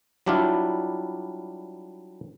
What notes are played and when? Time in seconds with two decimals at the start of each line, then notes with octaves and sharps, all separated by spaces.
0.26 F#3 G3 D4 E4 F4